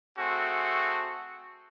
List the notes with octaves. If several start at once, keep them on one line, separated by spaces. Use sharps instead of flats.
A3 C4 F#4 G#4